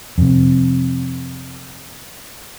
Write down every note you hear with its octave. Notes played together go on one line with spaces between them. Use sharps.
F2 C3